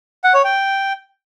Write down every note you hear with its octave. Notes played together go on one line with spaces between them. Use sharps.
F#5
C#5
G5